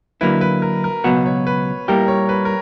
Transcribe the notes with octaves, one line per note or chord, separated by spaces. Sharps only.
D3 F#3 A#3 E4 B4
B4
A#4
A#4
C#2 B2 F#3 B3 F#4 B4
C#5
B4
A#2 G3 A#3 E4 G4 A#4
C#5
B4
A#4